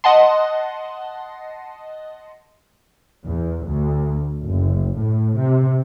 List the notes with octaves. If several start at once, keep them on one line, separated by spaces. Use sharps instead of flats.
D#5 F#5 A5 C6
E2
D2
F#1
A2
C3